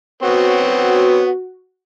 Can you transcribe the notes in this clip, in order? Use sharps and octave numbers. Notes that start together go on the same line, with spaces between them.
B3 C4 F#4 C#5